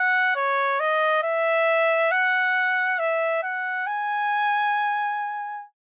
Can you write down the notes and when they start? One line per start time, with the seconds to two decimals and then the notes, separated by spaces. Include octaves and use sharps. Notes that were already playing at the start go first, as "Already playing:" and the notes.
Already playing: F#5
0.35 C#5
0.80 D#5
1.23 E5
2.11 F#5
2.99 E5
3.43 F#5
3.87 G#5